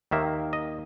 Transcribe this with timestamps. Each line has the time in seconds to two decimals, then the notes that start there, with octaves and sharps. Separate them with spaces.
0.11 D#2 D#3 A#3 E5
0.53 D#5